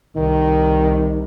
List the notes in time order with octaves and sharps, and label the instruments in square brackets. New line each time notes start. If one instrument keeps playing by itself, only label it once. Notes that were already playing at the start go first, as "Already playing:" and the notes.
[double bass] C2 [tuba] D#3